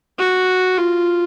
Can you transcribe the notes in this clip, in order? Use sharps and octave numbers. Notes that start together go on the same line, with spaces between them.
F#4
F4